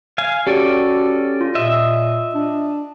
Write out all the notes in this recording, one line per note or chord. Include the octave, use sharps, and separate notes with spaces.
F5 G#5
C#4 F#4 G4 A4 D5
F4
A#2 D#5 E5
D4